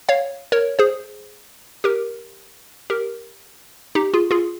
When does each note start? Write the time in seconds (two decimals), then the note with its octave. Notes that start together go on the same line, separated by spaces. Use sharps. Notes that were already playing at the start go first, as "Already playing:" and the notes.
0.09 C#5 F5
0.52 A#4 C#5
0.79 G#4 C5
1.84 G4 A#4
2.90 G4 A#4
3.95 D#4 G4
4.13 F4 G#4
4.31 F4 G#4